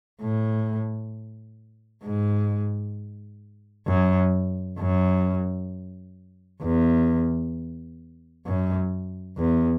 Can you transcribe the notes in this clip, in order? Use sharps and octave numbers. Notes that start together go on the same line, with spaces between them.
A2
G#2
F#2
F#2
E2
F#2
E2